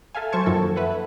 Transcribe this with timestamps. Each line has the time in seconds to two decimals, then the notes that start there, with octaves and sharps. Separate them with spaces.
0.15 A4 E5 F5 G#5
0.32 F#3 C5 A5 C#6 G#6
0.46 F#2 D#3 F3 A#3 A4
0.76 A4 B4 E5 F#5